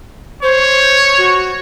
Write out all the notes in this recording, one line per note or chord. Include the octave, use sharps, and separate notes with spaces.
C5 C#5
F#4